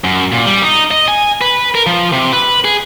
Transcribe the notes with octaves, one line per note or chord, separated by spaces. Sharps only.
F#2
A#2
G3
D#4
D#5
G#5
B4
A#4
F3
C3
B4
G#4